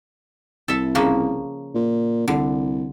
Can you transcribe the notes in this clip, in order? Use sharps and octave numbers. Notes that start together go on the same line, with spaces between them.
C2 A4 E5
C#3 F3 A#3
A#2
C2 D3